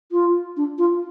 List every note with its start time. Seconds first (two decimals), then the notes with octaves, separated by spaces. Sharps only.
0.12 F4
0.57 D4
0.78 F4